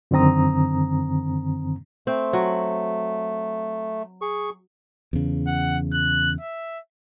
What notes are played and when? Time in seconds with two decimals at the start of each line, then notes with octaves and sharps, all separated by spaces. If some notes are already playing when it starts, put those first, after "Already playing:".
0.11 F#2 D3 D#3 C4 A#5 D#6
2.07 A3 C4
2.33 F#3
4.21 G#4 C#6
5.13 E2 C#3
5.47 F#5
5.93 F#6
6.41 E5